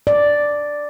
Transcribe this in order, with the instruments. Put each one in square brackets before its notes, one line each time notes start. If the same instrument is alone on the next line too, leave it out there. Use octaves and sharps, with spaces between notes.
[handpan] D5